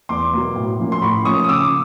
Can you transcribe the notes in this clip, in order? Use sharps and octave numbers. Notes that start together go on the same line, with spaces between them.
E2 C6 D6
B2 F#3 A#3
A2
F3 A#3 C#4
C6
A2 B5 C#6
F3 A#3 C#4 C#6 D#6
D#6
C#3 D6 E6